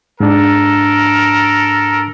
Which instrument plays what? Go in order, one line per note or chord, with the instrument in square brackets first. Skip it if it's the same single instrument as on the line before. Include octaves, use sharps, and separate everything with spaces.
[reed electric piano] G#2 D4 [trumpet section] A4 A#4